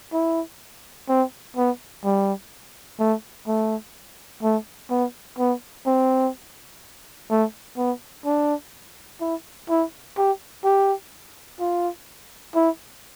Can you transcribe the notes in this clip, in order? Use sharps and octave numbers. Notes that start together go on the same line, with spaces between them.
E4
C4
B3
G3
A3
A3
A3
B3
B3
C4
A3
B3
D4
E4
E4
G4
G4
F4
E4